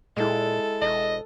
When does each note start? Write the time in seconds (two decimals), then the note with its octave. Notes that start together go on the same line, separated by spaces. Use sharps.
0.17 A#2 G#3 E4 A4
0.82 E1 D#5